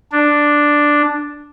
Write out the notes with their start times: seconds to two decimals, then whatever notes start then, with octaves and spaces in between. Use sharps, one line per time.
0.12 D4